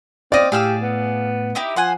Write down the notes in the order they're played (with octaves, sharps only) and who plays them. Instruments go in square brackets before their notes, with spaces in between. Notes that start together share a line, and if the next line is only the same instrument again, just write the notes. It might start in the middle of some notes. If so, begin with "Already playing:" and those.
[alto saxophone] C4 [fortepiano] D5 [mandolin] D#5 F5
[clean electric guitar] A2 [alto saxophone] G4 [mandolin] G#4 F5 E6
[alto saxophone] B3
[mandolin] D#4 E4 G4
[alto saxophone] F3 [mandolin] C5 F#5 G#5